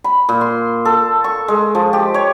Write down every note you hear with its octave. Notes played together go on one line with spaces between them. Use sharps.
B5
A#2
C6
A4
C#6
G#3
F3
G4
C#5